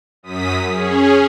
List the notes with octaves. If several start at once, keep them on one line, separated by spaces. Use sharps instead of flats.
F#2 D#6 B6
C#4 G#4